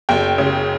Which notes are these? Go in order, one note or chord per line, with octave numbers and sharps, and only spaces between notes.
F#1 G5
C#3